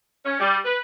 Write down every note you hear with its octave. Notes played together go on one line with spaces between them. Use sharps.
C#4
G3
B4